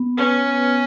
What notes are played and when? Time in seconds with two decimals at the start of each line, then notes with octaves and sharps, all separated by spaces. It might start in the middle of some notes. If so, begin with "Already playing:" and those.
Already playing: B3
0.17 C#4 B4
0.46 B3